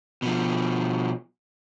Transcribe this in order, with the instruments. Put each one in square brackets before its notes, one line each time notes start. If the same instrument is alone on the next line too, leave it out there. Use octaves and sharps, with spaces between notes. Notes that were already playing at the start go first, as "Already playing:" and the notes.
[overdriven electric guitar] B2 F3